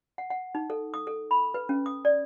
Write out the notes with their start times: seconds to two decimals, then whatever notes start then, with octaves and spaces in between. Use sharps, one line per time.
0.18 F#5
0.30 F#5
0.55 D#4
0.70 A4
0.94 D#6
1.07 A4
1.31 B5
1.54 B4
1.69 C#4
1.86 D#6
2.05 D5